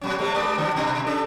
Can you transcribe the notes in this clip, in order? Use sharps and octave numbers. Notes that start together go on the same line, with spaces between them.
A#2 F#3 C#4
C3 G3 A3
G2 G#3 D5
D3 F#3 D4
G2 B2 D4
C#4 D4 A4